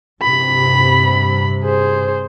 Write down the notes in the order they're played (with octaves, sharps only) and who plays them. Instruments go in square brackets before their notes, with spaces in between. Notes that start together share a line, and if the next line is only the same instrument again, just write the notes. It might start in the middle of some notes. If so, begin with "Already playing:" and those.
[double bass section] G2 C3 [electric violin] B5
[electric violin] G#4 C5